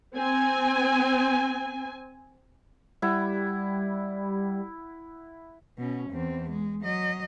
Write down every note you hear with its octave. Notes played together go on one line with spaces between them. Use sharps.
C4 G#5
G3 E4 F#5 B5
B2 C#4
E2 C4
G#3
F#3 D#5